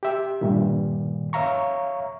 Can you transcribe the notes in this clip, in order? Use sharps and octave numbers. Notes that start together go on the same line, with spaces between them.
G4 E5
G2 A#2 D#3
C#5 E5 F5 A#5 C#6